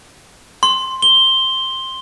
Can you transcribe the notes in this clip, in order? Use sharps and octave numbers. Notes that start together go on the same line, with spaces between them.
C6
G7